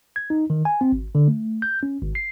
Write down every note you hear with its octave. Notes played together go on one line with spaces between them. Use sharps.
G#6
D#4
D#3
G#5
C4
G#1
D3
A3
G6
C#4
G#1
C7